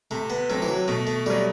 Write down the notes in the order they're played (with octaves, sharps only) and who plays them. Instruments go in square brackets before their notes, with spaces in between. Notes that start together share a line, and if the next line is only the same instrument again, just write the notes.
[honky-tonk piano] C3 [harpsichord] A3
[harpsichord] B3
[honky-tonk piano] F#3 C4 [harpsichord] A3
[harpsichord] E3
F#3
[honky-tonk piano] B2 [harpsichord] A3
[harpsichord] A3
[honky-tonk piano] F#3 A3 [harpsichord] G3